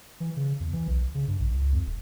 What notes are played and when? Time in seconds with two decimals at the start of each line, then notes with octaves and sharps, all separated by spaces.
0.20 E3
0.37 C#3
0.60 E2
0.73 E3
0.88 B1
1.15 C#3
1.27 G2
1.40 A#1
1.54 C#2
1.73 F2
1.86 D#1